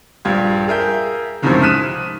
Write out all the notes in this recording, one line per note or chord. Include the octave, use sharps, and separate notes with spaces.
A#1 G2 F4 G4 G#6
G#4 A#4 E5 G6
C#2 F#2 A2 C3 D#3 F3
D#6 F6 F#6 B6 D#7 E7